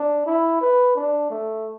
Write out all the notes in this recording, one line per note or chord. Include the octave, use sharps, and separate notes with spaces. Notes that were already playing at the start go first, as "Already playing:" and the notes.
Already playing: D4
E4
B4
D4
A3